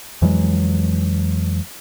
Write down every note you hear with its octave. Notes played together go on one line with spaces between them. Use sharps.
F2 E3 F#3 G#3